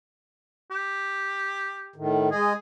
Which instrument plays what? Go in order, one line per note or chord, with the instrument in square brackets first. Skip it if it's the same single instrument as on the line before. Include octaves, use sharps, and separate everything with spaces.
[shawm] G4
[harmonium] A2 D#3
[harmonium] G#3 D#5 [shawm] G#4